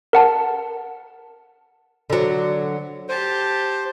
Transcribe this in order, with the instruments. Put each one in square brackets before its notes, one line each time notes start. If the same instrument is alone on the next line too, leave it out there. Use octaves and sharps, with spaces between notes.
[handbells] A#4 F#5 A5
[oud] D3 F#3
[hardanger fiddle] G4 A5 [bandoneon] C5